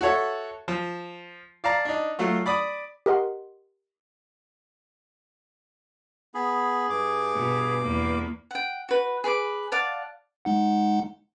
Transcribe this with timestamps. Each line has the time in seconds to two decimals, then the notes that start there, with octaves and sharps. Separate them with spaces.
0.01 F#4 A4 C#5 E5
0.68 F3
1.64 D5 F5 A5 A#5
1.85 D4 D#4
2.19 F#3 A3 F4
2.46 D5 B5 D6 D#6
3.06 G4 A#4 D#5 F#5 C6
6.35 B3 G#4 B5
6.90 G2 D6
7.35 B2
7.82 E2 A#3
8.51 F#5 G5
8.89 F#4 B4
9.24 G#4 B4 C#6 D6
9.72 D5 F5 F#5 A5
10.45 G#3 D#4 F#5